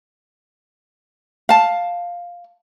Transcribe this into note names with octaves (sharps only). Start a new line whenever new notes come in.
F5 A5